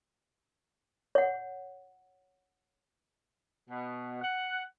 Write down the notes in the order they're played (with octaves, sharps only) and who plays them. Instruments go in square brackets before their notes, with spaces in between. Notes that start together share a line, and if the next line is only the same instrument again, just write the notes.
[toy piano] C#5 F#5
[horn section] B2
F#5